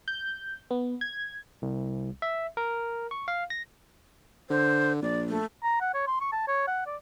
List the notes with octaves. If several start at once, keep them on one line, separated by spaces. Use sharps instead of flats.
G6
B3
G#6
C2
E5
A#4
C#6
F5
A#6
D3 C5
A#1 D5
A3
A#5
F#5
C#5
C6
C#6
A5
C#5
F#5
D5